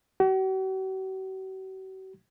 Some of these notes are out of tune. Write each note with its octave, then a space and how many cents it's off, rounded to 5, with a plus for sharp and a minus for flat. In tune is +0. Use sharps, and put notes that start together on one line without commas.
F#4 +45